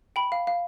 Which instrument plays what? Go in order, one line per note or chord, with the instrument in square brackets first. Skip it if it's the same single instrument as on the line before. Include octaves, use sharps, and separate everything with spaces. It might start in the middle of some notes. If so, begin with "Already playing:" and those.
[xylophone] G5 B5
F5
F5